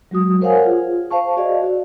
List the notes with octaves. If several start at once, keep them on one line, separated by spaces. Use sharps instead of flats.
F#3 G#3 F#4 D#6
A#4 C5 C#5 F5 F#5 G#5
F4 G#4
C5 F5 A5 C#6
F#4 G#4 D5 D#5 F5
F#4 D5